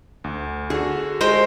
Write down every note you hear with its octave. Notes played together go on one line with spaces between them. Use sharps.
D2
D3 F#4 G#4
G#3 C5 G5